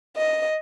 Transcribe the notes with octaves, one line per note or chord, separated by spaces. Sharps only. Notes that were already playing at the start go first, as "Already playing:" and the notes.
D#5